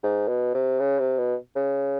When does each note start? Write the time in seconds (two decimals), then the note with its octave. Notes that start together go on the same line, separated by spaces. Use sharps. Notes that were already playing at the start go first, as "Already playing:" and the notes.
0.03 G#2
0.28 B2
0.54 C3
0.80 C#3
0.99 C3
1.18 B2
1.56 C#3